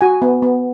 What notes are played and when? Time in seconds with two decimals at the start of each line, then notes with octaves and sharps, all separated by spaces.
0.01 F#4 G#5
0.22 B3
0.42 B3